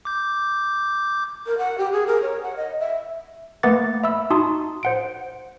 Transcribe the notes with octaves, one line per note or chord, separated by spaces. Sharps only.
D6 G6
A#4
F#5
G4
G#4
A#4
C#5
F#5
D#5
E5
A3 A#3 B4 F#5 D6 A6
E5 B5 E6
D#4 F#4 A5 C6 D#6
C5 F#5 D7